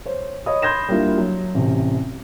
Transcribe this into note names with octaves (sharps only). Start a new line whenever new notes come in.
C5 C#5
C#5 D#5 B5 D#6
B5 C6 G6 G#6 A#6 E7
G3 A#3 D4 E4 F4
F#3
A1 C3